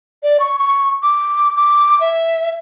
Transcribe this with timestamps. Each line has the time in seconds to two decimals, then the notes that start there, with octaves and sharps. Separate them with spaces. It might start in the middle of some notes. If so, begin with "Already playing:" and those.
0.23 D5
0.40 C#6
0.59 C#6
1.03 D6
1.56 D6
2.00 E5